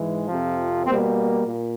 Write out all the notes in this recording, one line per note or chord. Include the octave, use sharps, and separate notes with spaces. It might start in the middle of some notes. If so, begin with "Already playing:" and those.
Already playing: G#2 E3 G#3
F2 C3 F3
B2 G3 A#3 C4
A#2